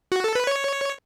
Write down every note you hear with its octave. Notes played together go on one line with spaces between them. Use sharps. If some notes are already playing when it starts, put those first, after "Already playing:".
F#4
A4
B4
C#5